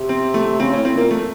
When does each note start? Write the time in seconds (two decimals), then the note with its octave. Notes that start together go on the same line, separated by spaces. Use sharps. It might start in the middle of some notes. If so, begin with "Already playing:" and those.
Already playing: C3
0.09 C4
0.34 A3
0.60 C#3 C4
0.73 A2 C#4
0.85 C4
0.93 A#2 A#3
1.11 A3